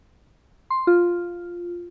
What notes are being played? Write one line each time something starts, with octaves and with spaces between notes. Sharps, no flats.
C6
F4